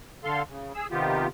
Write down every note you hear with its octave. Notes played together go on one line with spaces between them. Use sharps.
D3 A4 F5 C6
C#3
G#4 E6
C3 D#3 B3 F4 G4